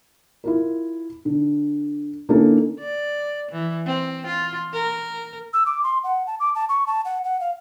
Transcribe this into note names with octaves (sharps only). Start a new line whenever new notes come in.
E4 F4 A#4
D3
D3 A#3 C#4 D#4 E4 A4
D5
E3
C4
F4
A#4
E6
D6
C6
F#5
A5
D6
A5
C#6
A5
F#5
F#5
F5